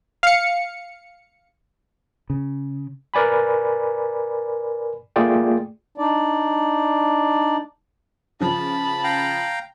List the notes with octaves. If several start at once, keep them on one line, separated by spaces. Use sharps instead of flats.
F5 C#7
C#3
A#4 B4 D5 G#5 B5
A3 A#3 F4 G#4 D5 G5
D4 D#4 D5
C#3 F3 A5 B5
F5 G5 A#5